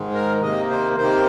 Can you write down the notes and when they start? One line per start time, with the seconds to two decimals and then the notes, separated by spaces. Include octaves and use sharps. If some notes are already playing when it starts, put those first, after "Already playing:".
Already playing: G#2 D#3 G#3
0.14 A#4
0.42 C3 D#3 A#3 D#5
0.70 C5
0.98 C3 D#3 A#3 C5